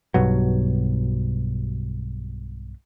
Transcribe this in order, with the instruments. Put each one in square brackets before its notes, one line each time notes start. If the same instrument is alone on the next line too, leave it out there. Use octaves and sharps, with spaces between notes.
[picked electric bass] B1 G2 B2 F#3